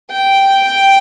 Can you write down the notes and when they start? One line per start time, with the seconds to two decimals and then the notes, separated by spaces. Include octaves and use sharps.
0.13 G5